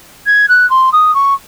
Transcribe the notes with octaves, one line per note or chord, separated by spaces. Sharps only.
G#6
F#6
C6
D#6
C#6